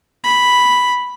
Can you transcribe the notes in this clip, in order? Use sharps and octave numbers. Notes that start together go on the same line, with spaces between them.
B5